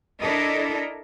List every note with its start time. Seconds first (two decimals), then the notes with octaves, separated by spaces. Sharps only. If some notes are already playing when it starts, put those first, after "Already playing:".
0.19 D4 E4 A4 A#4 D5 D#5